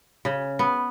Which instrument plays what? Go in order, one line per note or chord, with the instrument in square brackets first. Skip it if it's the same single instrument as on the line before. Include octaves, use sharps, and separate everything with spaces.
[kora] C#3
B3